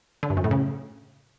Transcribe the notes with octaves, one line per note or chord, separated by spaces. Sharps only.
D3
G2
F#2
A2
C#3